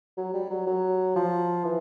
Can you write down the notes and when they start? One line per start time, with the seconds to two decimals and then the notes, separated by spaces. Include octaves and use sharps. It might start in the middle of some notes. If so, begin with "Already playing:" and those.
0.17 F#3
0.33 G3
0.50 F#3
0.66 F#3
1.15 F3
1.65 E3